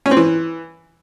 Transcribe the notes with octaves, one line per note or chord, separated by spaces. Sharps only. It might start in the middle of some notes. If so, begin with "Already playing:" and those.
C#4
C4
E3